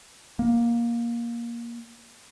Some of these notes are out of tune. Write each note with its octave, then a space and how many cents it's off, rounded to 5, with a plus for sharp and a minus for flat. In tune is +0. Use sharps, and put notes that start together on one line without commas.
A#3 +15